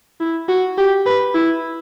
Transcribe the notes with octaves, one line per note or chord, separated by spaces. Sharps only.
E4
F#4
G4
B4
E4